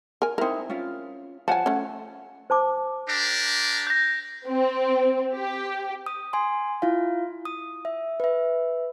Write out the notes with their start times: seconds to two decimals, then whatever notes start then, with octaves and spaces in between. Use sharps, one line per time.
0.22 A#4 G#5
0.38 C4 D#4 E4 A#4
0.70 C#4 F4
1.48 F3 C#5 F#5 G#5 A5
1.66 A3 C#4
2.50 C5 A5 D6
3.08 D4 G4 A#4
3.87 G6 A#6
4.46 C4
5.33 G4
6.06 D#6
6.33 G#5 C6
6.82 E4 F4 F5
7.45 D#6
7.85 E5
8.20 B4 E5